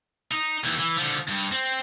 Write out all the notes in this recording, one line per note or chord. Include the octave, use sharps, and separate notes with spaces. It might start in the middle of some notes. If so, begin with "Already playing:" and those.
D#4
D#2 E3
E3
D3 F3
G2
C4